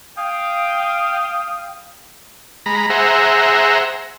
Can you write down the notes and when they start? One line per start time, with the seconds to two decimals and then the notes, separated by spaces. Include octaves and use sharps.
0.18 F5 G5 D#6
2.66 G#3 A#5 B5
2.90 G#4 C5 E5 F#5 A#5